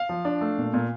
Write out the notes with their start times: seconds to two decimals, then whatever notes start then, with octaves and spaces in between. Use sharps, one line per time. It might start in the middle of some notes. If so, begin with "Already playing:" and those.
Already playing: F5
0.09 F3
0.25 D4
0.41 A3
0.58 A#2
0.74 A#2